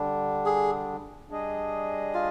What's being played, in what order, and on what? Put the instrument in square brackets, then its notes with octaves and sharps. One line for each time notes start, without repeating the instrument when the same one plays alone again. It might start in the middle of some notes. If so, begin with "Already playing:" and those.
Already playing: [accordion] D3 G3 D4
[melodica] G#4
[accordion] G3 D4 G#4 D#5
[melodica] F4